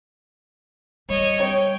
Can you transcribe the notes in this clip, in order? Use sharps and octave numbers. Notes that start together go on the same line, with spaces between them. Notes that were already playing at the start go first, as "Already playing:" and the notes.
G3 C#5 D#5
C#5 G5